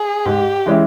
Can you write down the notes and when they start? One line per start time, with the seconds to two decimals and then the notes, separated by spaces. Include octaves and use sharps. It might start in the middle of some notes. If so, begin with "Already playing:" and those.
Already playing: G#4
0.26 G#2 G4
0.66 E3 G#3 C#4 E4